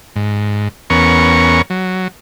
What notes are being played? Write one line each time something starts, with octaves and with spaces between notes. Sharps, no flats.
G#2
E2 B3 C#4 A#4 C#6
F#3